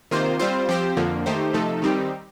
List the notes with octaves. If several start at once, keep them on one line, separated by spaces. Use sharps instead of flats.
C3 D#3 A#3 F4 C5
G3 C4 F4 C5
F3 C4 G4 C5
F2 D3 F3 A#3
D#3 A3 D#4 G4 C5
C3 F3 A3 D#4 A4
D#3 G3 C4 D#4 G4